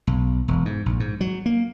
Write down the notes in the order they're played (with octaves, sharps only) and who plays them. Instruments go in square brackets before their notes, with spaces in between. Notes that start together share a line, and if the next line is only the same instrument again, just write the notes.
[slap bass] B1
E1
G#2
A#1
G#2
F#3
A#3